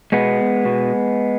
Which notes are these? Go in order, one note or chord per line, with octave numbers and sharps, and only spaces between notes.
B2 G#3 B3
B2